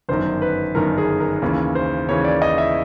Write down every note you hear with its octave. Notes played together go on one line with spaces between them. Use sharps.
G1 F#2 D#3 C5
B4
G1 F#2 D#3 A#4
G#4
A#4
D#2 C#3 E3
C5
D#2 C#3 E3 C#5
D5
D#5
E5